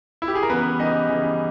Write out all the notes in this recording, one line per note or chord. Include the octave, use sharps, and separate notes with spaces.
E4
G4
G#4
A#4
C#3 E3 G3 B3 B4
C#3 E3 G3 D#4 D#5
C#3 E3 G3